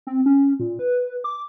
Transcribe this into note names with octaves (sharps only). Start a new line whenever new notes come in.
C4
C#4
A#2
B4
D6